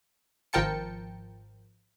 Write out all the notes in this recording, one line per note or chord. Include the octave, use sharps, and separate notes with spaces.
G#1 F3 A#4 G5 A5 C#7